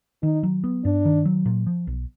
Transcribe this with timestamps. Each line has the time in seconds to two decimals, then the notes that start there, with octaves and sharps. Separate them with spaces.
0.23 D#3 D#4
0.43 F#3
0.64 B3
0.84 G2 D4
1.05 D#3
1.25 F#3
1.46 A#2
1.67 F3
1.87 B1